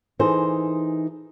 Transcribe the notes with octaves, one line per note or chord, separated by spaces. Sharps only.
E3 D#4 G#4 A4 C5